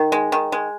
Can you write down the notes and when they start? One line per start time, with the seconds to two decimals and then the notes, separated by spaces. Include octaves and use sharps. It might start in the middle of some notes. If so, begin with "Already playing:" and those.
Already playing: D#3
0.12 G#3
0.32 D#3
0.52 G#3